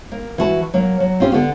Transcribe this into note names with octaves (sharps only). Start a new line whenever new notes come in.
A#3
E3 F#4 A5
F#3 A#3
F#3
C4 C#4 F4 G4
D3 B3